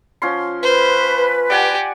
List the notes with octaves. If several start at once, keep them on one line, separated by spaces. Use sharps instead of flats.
F3 C#4 C6
B4 C5
G4 D5 F#5 G#5